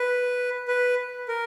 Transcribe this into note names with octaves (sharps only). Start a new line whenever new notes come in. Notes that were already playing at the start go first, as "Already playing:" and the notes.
Already playing: B4
B4
A#4